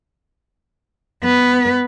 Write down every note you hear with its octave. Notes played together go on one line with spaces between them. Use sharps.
B3 B4